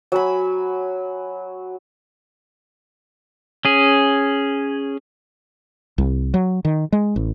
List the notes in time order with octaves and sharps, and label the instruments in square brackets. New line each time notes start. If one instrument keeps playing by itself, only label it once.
[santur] F#3 G#5 B5
[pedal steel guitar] C#4 G#4
[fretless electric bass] C2
F#3
D#3
G#3
A1